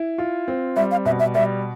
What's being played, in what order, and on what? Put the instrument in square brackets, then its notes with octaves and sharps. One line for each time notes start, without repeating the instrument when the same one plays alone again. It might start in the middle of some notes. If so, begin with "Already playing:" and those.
Already playing: [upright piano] E4
F4
C4
[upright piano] G3 [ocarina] E5
[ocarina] F5
[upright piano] B2 [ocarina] E5
[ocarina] E5
[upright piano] G3 [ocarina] E5